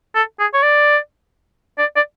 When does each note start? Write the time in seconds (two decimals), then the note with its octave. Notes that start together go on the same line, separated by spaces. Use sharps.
0.15 A4
0.40 G#4
0.54 C#5
0.63 D5
1.78 D5
1.96 D5